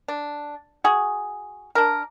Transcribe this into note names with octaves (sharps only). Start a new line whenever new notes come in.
D4
F#4 G#4
D4 A#4